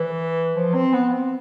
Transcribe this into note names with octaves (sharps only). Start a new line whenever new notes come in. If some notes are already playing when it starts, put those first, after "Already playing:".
Already playing: E3
F3
C4
B3
C4